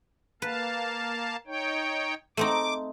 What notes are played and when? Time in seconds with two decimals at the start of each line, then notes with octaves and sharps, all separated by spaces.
0.42 A#3 B4 F5 A5
1.47 D#4 C#5 G5
2.37 A3 C4 D#4 D6